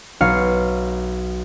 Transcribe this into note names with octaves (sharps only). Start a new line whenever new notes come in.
B1 F5 C#7